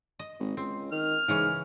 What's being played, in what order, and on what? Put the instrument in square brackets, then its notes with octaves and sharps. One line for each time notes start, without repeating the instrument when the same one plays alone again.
[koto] D#5
[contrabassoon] G#1
[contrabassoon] C#2 [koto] C4
[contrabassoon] D#3 [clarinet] F6
[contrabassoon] G#2 [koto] C#3 E3 C#4